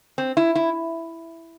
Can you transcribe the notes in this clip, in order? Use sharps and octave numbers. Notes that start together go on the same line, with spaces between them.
C4
E4
E4